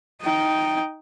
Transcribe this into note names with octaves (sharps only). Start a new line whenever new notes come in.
D#4 G5